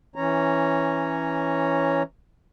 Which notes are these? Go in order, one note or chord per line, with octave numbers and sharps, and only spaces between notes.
E3 C#4 C#5 A#5